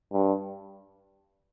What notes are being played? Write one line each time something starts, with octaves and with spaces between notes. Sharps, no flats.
G2